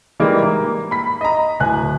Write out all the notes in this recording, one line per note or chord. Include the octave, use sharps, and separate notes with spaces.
E3 G3 G#3 A#3 D#4
A#3
B5 B6
D#5 A#5
D1 G#5 F#6